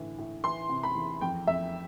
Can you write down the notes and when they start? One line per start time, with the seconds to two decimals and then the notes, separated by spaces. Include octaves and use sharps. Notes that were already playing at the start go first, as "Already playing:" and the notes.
Already playing: A2 D3 E3
0.18 A2
0.44 E3 C6
0.69 C3
0.83 B5
0.95 E2
1.21 F2 G5
1.47 F2 E5